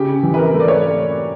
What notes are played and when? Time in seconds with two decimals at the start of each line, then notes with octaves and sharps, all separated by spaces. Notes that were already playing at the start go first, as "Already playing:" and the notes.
Already playing: C#3 G4
0.23 E3
0.34 B4
0.38 A#4
0.54 A3
0.60 D5
0.68 C#5